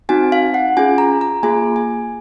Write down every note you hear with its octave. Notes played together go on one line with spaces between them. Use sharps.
C4 D#4 F#4 G#5
F5
F#5
C#4 F4 G#4 G#5
A#5
A#5
A#3 F4 G#4 G#5
G#5